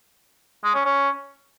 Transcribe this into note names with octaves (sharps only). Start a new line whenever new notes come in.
G#3
C#4
C#4